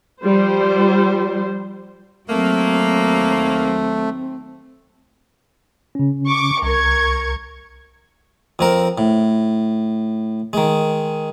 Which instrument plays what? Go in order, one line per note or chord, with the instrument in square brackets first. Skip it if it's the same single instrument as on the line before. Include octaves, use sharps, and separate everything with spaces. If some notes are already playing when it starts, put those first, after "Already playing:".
[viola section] F3 G3 C5
[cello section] D#2 F#3 [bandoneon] A3 [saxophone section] A#3 [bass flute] C4
[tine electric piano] C#3 C#4
[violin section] C#6 D6
[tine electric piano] C2 [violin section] A#4 C#6 G#6
[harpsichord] F2 C4 A#4
A2
D#3 G#3